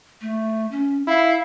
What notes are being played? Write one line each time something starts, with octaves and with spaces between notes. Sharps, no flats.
A3
C#4
E4 F5